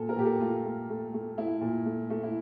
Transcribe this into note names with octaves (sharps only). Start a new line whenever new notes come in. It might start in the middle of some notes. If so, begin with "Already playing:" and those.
Already playing: A#2 A4
A#4
A#2 G4
A4
A3 F4
A3
A3
A3
A3 E4
A#2
A3
A3
E4